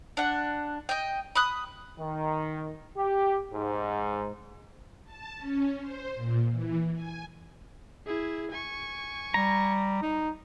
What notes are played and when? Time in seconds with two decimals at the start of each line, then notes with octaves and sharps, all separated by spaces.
0.17 D4 F#5
0.89 D#5 G5
1.35 B5 D#6 F#6
2.00 D#3
2.96 G4
3.54 G#2
5.05 A5
5.37 C#4
5.79 C5
6.15 A#2
6.49 E3
6.93 G#5
8.06 E4 G#4
8.51 G#5 C#6
9.34 G3 A#5
10.02 D#4